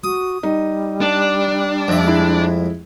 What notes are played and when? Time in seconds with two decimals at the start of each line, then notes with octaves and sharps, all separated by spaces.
0.04 F#4 D#6
0.43 G3 D#4
1.01 D4
1.88 F2 E5
2.04 G#3 E4